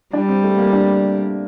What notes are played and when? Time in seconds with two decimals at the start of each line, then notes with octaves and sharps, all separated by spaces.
0.13 G3 D4
0.29 C4
0.44 A3
0.58 A#3
0.73 D4